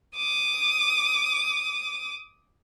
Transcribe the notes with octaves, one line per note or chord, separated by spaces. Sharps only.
D6 D#6